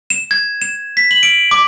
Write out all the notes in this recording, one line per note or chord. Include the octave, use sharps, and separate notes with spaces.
E7
G#6
E7
B6
F#7
D7
D6